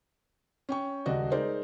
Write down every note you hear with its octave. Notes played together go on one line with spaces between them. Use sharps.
C#4 G5 C#6
D#1 C#2 F#4 D5 D#5
G#3 D#4 A#4 C5 D5